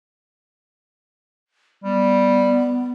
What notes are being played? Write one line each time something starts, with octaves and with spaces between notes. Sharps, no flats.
G3 B3